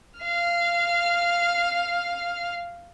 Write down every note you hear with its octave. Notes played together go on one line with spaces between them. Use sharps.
F5 F6